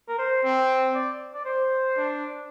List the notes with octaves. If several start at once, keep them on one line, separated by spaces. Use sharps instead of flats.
A#4
C5
C4
D5
D5
C5
D4